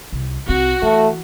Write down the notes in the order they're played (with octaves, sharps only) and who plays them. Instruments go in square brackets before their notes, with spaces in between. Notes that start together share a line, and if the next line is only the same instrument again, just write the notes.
[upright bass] C2
[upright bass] C2 C4 [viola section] F#4
[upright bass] E3 [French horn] A3